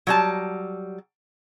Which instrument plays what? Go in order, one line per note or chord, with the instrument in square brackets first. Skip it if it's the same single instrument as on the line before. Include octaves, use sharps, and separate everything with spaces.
[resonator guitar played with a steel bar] F#3 G3 A5